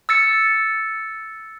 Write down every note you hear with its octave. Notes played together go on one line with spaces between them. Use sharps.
E6 A6 C#7